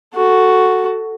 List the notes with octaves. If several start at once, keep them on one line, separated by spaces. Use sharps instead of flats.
F#4 A4